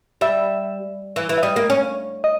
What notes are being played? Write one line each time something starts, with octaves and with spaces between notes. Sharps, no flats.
G3 E5
E3
E3
E5
G3 D#5
A#3
C#4
D#5